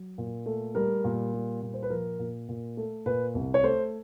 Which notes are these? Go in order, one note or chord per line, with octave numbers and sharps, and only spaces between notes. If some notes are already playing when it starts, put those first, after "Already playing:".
Already playing: F#3
A#2
A3
G3 A#4
A#2
G3
A#2
C5
B4
F3 A#4
A#2
A#2
A3
A#2 B4
C2
C#5
A3 C5